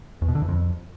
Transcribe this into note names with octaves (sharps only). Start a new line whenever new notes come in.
E2
B2
D3
E2
F2